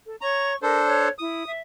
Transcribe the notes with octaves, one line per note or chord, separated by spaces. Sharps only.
A4
C#5 A#5 C#6
D4 A4 A#4 C5
C#5 F#6
E4 D#6
E5